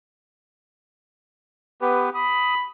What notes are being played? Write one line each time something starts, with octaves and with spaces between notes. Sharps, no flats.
B3 G4 B4
B5 D#6